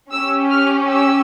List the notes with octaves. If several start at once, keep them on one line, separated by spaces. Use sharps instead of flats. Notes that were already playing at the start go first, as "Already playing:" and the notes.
C#4 G4 E6
F6
E6